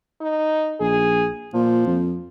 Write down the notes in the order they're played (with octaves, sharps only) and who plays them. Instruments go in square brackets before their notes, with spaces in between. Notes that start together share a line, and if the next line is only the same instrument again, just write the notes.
[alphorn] D#4
[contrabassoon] A#1 [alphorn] G#4
[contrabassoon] A#2 [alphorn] F3
[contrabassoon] F2